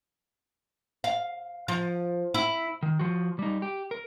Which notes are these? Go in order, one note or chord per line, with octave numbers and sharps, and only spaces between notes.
F5
F3
E4
D#3
F3 F#4
G3 D#4
G4
A#4